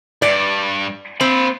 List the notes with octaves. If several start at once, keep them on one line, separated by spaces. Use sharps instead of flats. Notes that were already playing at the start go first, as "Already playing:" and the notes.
G2 D5
A#3 C4 B5